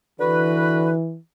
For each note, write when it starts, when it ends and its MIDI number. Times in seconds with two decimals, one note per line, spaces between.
0.20 0.95 50
0.20 1.18 52
0.20 0.95 66
0.20 0.95 71